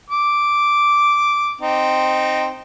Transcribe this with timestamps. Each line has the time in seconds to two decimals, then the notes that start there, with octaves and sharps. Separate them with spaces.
0.10 D6
1.61 C4 D#4